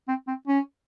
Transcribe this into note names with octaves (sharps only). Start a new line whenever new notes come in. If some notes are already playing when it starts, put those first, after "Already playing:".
C4
C4
C#4